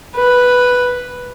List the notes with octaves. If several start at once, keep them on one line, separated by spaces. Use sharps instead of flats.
B4